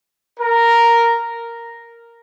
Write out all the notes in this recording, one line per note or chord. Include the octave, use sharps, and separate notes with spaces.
A#4